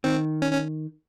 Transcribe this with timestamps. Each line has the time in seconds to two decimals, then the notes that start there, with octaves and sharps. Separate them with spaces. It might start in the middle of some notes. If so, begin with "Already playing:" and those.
0.04 D#3 C4
0.42 C#4
0.53 C#4